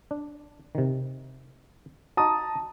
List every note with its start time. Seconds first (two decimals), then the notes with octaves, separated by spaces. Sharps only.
0.11 D4
0.75 C3 D#3
2.17 D#4 F#4 A5 A#5 D#6